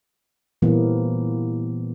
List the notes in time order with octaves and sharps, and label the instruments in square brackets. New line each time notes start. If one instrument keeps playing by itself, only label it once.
[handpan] A#2 E3 F3 G3 A#3 B3